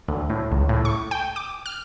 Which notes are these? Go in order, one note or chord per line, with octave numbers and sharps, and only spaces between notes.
D2
A2
C#2
A2
C#6
G5
D6
F6